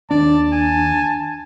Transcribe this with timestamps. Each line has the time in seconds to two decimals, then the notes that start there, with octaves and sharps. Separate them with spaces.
0.11 D#2 D4 D5 A5
0.52 G#5